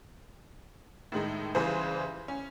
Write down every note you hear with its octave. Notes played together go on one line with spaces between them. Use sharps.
A2 D#3 G#3 D#4
C2 C#3 E3 B4 C5 G#5
C#4